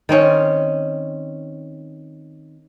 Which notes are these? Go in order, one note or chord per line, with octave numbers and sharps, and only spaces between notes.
D#3 C4 C#4